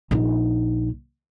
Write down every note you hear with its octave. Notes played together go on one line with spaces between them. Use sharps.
A#1 D#4